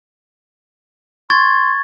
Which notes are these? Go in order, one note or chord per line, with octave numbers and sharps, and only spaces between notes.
C6 C#6 G#6 A6